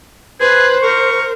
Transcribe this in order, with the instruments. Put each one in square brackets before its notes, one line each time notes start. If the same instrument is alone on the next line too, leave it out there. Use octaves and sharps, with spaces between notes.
[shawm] G#4 [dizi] B4 [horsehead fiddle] C5
[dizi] A#4 [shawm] C#6